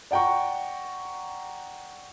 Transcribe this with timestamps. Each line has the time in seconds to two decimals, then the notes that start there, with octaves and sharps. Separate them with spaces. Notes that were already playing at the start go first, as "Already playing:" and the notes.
0.11 D5 F#5 G5 A#5 C#6